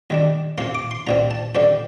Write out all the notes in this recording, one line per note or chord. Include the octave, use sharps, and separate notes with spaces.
D#2 D#3 G3 D4
C3 F3 A#3 C6
D6
C6
C2 A#2 G3 C4 A#5
A5
F2 D3 G3 D4 C5